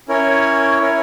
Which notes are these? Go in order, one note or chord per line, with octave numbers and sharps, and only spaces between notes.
C#4 E4 A#4 C#5
C#4 E4 A#4 C#5